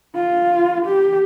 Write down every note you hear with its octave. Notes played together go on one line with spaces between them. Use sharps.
F4
G4